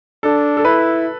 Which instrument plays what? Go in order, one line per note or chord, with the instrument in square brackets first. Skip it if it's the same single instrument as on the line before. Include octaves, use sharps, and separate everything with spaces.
[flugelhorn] D4 [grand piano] A4
[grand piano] A4
[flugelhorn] E4 [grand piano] B4